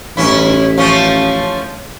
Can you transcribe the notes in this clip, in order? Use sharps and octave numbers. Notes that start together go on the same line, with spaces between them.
A1 G2 C#4 E4
F3 A3 C#4